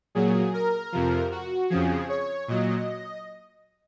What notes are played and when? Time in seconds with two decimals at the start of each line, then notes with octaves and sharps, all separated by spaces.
0.15 A#2 F#3 G#4
0.53 A#4
0.92 F2 C3 F3
1.31 F#4
1.70 F2 C#3 F3 G#4
2.09 C#5
2.48 A#2 F#3 D#5